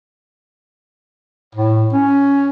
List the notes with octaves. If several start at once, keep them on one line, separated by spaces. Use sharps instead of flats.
A2
C#4